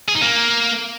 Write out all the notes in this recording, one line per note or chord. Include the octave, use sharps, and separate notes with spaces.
G#4
D#4
A#3